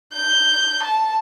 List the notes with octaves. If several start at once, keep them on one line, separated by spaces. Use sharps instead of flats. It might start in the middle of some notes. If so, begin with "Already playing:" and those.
G6
A5